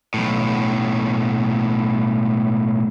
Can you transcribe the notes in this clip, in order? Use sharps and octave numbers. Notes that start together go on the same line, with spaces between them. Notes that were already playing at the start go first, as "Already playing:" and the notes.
B1 A2